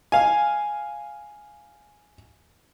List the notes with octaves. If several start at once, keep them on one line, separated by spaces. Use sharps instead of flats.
F5 G#5